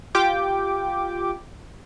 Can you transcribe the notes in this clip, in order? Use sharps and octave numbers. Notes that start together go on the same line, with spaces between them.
F4 G4 G5 D6